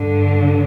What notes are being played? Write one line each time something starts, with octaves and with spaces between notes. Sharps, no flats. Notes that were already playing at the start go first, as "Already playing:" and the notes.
Already playing: G2 D3